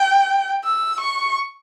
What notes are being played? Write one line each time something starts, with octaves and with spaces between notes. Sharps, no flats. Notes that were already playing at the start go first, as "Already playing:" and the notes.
Already playing: G5
E6
C#6